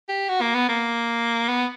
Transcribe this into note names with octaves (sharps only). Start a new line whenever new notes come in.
G4
F#4
A#3
B3
A#3
B3